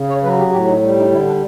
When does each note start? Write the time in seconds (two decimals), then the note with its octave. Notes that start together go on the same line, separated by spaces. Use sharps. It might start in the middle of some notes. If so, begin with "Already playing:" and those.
Already playing: C#3
0.09 C#5
0.23 F#3 B4
0.38 G4
0.52 A2 G4
0.68 D#4
0.82 G3
0.98 D#4
1.12 D3 E4
1.27 D4